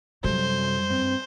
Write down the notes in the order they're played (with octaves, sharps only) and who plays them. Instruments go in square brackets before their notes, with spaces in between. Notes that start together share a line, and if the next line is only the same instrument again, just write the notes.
[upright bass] F#2 G3 [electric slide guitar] C3 F#3 A4 [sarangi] C5
[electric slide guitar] G2 C4